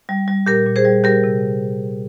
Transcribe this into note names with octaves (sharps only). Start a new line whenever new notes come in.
G3
G3
A#2 G4 A#4
A#2
G#4 C5
G3
G3 G4 A#4
C3